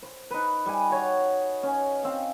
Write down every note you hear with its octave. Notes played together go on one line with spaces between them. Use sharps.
C5
D#4 B4
G3 G#5
F#4 C#5
C#4
C4 F5